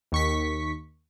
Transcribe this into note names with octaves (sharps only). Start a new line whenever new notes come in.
D#2 C#6 B6